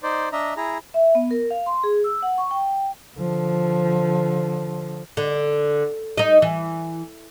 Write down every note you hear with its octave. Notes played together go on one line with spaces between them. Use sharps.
D#4 C5 D5
D4 D#5 E5 A#5
E4 G#4 A#5
E5
B3
A#4
F5
C6
G#4
E6
F#5
C#6
G5
D3 F3
D3
D#4 D#5
E3